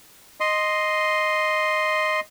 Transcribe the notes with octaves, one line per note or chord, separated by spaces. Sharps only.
D#5 C6